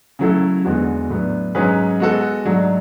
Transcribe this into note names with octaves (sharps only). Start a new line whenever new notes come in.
C#3 F#3 A3 E4 A4
E2 D3 G#3 B3 F#4
A2 F#3 B3 D4
G#2 F#3 C#4 G#4 B4
G#3 B3 F#4 A4
G#2 F#3 A3 D4